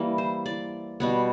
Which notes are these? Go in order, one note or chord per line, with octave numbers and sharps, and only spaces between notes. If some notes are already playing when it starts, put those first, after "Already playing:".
Already playing: E3 G3 A#3
C5
D5
B2 G3 B3